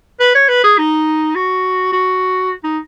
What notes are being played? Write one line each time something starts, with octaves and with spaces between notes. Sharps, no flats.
B4
C#5
B4
G#4
D#4
F#4
F#4
D#4